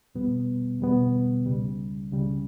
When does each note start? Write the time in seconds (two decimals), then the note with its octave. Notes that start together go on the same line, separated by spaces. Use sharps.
0.15 E2 B2 G3 B3
0.80 E2 B2 G3 B3
1.46 C#2 C#3 G3
2.11 C#2 C#3 G3